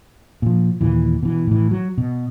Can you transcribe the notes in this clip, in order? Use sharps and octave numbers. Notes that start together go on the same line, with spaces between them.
A#2 F3
D#2 A#2 E3
B2 E3
A2 E3
F#3
B2